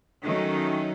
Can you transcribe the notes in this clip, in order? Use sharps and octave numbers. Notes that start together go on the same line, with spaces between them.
D#3 F#3 A3 C#4